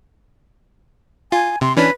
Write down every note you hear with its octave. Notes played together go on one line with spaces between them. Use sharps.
F4 G#5
C3 C6
E3 C#4 D4 B4